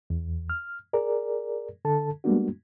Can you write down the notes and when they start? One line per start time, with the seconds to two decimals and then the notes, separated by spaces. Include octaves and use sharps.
0.10 E2
0.50 F6
0.93 G#4 A#4 D5
1.85 D3 A4 A5
2.24 G3 G#3 A#3 B3 D4 F#4